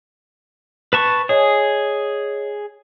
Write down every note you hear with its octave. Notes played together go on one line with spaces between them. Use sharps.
B4 A5 C#6
G#4 C#5 D#5 G#5